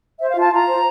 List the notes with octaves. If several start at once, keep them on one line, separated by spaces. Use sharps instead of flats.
C5 E5
F5
F4
A5
F4 A#5
C5